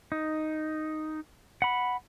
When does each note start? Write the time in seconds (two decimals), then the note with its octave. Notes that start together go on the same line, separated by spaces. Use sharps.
0.12 D#4
1.62 F#5 B5